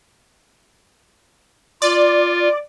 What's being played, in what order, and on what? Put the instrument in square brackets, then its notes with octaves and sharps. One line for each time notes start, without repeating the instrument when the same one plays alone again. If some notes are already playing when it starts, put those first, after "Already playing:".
[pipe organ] F4 [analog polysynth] D5